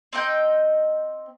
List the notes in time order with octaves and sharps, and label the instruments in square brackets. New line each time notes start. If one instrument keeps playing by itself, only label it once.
[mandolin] C4 D#4 D#5 G5